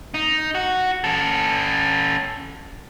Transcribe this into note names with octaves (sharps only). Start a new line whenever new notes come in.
D#4
F#4
C#4 A4